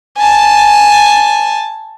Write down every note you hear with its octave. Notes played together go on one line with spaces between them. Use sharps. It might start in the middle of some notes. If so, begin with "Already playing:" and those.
G#5 A5